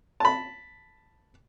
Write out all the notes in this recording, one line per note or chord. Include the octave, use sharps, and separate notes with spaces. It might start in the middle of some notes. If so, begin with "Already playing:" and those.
A5 B5